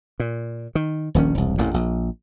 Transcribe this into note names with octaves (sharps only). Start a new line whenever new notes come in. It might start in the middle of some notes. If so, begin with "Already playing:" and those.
A#2
D#3
D#1 A#1 D#3 C#4
E1 C2
A1 F2 A#2
A#1